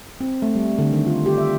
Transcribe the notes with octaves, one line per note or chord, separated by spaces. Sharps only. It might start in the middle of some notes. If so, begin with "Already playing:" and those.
C4
A3
G3
D3
D#3
F4
G4
E5